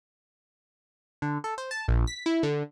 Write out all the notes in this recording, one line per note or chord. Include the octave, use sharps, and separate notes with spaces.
D3
A4
C5
A5
A#1
B6
E4
D3